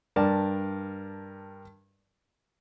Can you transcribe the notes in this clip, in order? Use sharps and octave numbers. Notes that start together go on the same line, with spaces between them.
G2 A#4 D5 A5